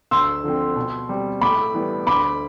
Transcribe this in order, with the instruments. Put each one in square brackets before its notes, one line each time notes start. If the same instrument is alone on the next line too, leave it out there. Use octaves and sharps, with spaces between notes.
[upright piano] D2 C6 E6
D3 F3 C4
B2
G3 C4
A2 B5 D6
E3 G3 B3
D2 B5 D6